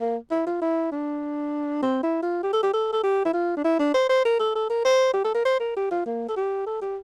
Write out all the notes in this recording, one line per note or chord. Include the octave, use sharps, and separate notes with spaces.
A#3
E4
F4
E4
D4
C4
E4
F4
G4
A4
G4
A4
A4
G4
E4
F4
D4
E4
D4
C5
C5
A#4
A4
A4
A#4
C5
G4
A4
A#4
C5
A#4
G4
F4
A#3
A4
G4
A4
G4